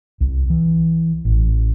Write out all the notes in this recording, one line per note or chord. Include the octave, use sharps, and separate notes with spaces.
C2
E3
A1